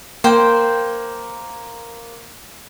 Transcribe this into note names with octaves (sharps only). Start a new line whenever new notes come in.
A#3 C5 G5